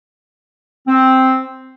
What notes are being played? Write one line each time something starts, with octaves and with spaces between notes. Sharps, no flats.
C4